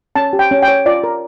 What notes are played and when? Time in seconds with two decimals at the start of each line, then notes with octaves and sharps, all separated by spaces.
0.16 C#4 A5
0.33 G4
0.39 G5
0.51 C#4
0.62 G5
0.68 C#5
0.86 F4 D5
1.04 A#4